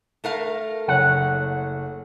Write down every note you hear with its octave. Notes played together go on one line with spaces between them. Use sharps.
A3 A#4 F5
F#1 C#5 F#5